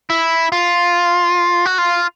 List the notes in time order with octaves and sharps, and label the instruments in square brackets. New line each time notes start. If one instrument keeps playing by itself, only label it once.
[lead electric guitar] E4
F4
F#4
F4